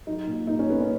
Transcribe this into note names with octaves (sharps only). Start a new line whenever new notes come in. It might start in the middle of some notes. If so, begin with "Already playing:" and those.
F#3 D#4
A#2
A#3 D#4
C#4
A#3 B3
C#4